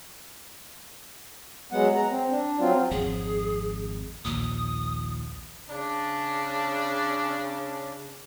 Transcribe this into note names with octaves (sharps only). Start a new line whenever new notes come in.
F#3 G#3 B3 F#5
A#5
C4
D4
F#3 C4 F4
G#1 F2 C4 G#4
A#1 D#2 A#2 D#6
C#3 D4